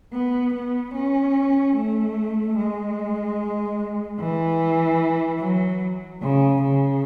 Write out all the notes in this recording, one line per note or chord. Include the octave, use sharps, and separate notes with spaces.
B3
B3
C#4
A3
G#3
E3
F#3
C#3
C#3